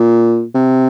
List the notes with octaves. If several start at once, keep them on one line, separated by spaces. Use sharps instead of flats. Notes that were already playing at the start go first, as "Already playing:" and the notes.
Already playing: A#2
C3